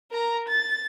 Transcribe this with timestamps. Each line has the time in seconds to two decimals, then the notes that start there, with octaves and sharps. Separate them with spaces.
0.11 A#4 A#5
0.48 A6